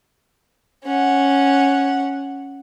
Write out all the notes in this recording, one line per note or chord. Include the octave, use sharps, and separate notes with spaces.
C#4 F#5